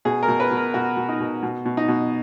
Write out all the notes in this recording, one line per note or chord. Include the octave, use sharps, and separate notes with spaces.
B2 G#4
A#4
B2
B4
B2
A#4
B2 F#4
B2
D#4
B2
B2
B2
D#4
B2